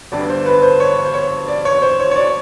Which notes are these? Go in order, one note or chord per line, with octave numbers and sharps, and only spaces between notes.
G1 G2 D3 D5
C5
B4
C5
C#5
C5
C#5
D5
C#5
C5
C#5
C#5
D5